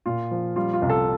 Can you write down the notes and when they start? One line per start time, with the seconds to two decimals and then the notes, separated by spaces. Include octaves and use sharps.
0.06 A#2 F4
0.31 F3
0.56 G3 F4
0.73 F4
0.82 C2
0.90 A4